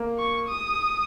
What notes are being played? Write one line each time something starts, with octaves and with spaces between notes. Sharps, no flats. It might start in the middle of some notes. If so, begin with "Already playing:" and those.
Already playing: A#3
C#6
D#6